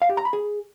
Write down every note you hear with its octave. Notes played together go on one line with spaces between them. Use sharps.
F5
G4
A#5
B5
G#4